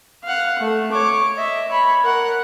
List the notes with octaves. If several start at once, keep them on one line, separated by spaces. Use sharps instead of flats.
F5 F#5
A3
C#5 D6
D#5 E5
C#5 B5
A#4 F#5